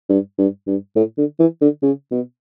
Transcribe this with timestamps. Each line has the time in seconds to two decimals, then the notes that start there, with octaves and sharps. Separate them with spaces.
0.09 G2
0.38 G2
0.67 G2
0.96 A2
1.18 D3
1.39 E3
1.61 D3
1.82 C#3
2.12 B2